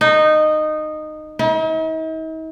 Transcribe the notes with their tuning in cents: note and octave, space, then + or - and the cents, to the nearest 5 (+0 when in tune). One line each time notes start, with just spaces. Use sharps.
D#4 -15
D#4 +45